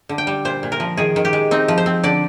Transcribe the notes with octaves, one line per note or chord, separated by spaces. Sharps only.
D3
G5
G3
A#2 C5
A#2
A#4
F3
D#3 G#4
D#3
G4
G#3
C4 D#4
F3
C5
C4
D3 D5